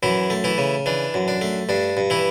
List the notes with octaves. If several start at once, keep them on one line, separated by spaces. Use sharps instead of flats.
F#2 E3 E4
A3
E3 E4
C#3
E3 D4
F#2
D4
A3
G2 D4
G2
E3 E4